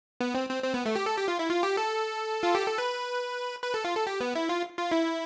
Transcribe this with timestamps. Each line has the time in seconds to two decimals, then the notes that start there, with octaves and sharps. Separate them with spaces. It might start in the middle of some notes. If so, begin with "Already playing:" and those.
0.21 B3
0.35 C4
0.49 C4
0.63 C4
0.74 B3
0.86 A3
0.96 G4
1.06 A4
1.17 G4
1.28 F4
1.39 E4
1.49 F4
1.63 G4
1.77 A4
2.43 F4
2.55 G4
2.66 A4
2.78 B4
3.63 B4
3.74 A4
3.85 F4
3.95 A4
4.07 G4
4.20 B3
4.35 E4
4.49 F4
4.78 F4
4.92 E4